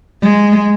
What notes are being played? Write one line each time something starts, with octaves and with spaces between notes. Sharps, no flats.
G#3